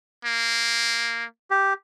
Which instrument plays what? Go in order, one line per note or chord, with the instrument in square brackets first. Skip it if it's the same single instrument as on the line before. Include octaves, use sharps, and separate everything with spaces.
[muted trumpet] A#3
[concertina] G4